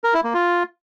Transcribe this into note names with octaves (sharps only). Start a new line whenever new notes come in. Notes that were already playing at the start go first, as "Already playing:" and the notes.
A#4
E4
A#3
F4